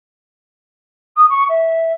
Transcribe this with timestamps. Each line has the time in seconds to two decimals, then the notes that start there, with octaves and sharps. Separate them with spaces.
1.16 D#6
1.29 C#6
1.48 E5